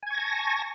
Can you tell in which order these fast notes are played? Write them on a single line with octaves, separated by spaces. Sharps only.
G#5 G#6 C#6 A#6 A5